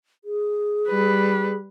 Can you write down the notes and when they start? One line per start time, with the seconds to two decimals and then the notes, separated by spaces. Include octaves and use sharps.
0.25 G#4
0.88 G3 B4